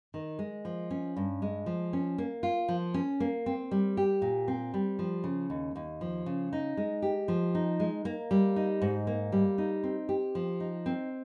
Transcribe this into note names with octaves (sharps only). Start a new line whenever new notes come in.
D#3
G#3
F3
C#4
G2
G#3
F3
C#4
A#3
F4
F3
C#4
A#3
C4
G3
G4
A#2
C4
G3
F3
C#3
D#2
D#2
F3
C#3
D#4
G#3
G4
F3
D#4
G#3
A#3
G3
D#4
G#2
A#3
G3
D#4
C4
G4
F3
D#4
C4